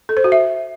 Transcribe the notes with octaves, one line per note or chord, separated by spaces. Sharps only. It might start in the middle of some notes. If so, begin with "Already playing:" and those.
A4
C5
F#4
E5